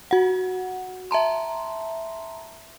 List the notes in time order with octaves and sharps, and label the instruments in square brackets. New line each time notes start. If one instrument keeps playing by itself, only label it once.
[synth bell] F#4 F#5
E5 A5 A#5 C6